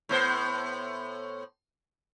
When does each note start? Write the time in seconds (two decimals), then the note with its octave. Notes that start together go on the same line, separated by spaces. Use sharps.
0.09 A2 B3 C5